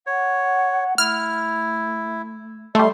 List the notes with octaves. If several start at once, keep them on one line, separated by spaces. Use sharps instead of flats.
C#5 F#5
A3 E4 F6
G3 A3 D#5 C6